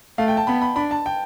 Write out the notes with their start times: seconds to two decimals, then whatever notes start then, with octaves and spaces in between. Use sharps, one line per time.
0.18 A3 F5
0.28 G5
0.37 A5
0.47 B3 B5
0.61 B5
0.76 D4 B5
0.91 A5
1.06 G5